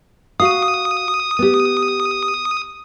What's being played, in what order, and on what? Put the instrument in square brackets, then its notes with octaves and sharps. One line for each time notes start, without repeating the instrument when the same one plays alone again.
[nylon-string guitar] F#4 F5 [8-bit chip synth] D#6
[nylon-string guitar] B3 G4